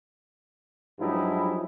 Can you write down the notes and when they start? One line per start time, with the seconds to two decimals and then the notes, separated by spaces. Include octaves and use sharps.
0.99 G2 F3 F#3 G#3 D#4 E4